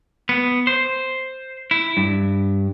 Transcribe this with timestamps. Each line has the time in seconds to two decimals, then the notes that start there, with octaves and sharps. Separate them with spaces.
0.29 B3
0.67 C5
1.71 E4
1.97 G2